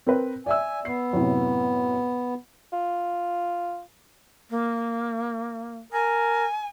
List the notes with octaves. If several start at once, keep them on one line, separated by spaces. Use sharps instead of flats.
C4 A#4 B4
D5 E5 G#5 E6
B3 C7
F#2 A2 C3
F4
A#3
A#4 G#5